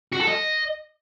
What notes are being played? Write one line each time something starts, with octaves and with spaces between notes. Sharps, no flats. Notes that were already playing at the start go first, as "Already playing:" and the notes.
F#4
A4
D#5